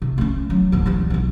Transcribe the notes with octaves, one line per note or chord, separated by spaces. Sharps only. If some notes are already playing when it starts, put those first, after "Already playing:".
C3
A3 C#4
F#3
D1 B3
E3 G3
B1 D#4